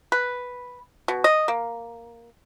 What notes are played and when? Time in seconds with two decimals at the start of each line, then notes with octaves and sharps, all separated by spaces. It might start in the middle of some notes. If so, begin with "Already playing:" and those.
0.12 B4
1.08 B2
1.24 D#5
1.48 A#3